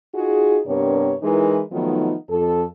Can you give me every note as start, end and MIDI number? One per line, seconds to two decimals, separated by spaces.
0.14 0.59 63
0.14 0.59 65
0.14 0.59 66
0.14 0.59 68
0.66 1.14 43
0.66 1.14 48
0.66 1.14 59
0.66 1.14 62
0.66 1.14 70
0.66 1.14 73
1.22 1.61 52
1.22 1.61 56
1.22 1.61 63
1.22 1.61 64
1.22 1.61 70
1.22 1.61 71
1.72 2.14 51
1.72 2.14 53
1.72 2.14 54
1.72 2.14 57
1.72 2.14 59
1.72 2.14 63
2.30 2.64 41
2.30 2.64 69